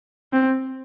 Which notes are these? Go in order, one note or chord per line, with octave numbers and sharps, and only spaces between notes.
C4